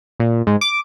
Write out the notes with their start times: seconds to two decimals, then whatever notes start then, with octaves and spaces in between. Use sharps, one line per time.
0.20 A#2
0.47 G#2
0.61 D6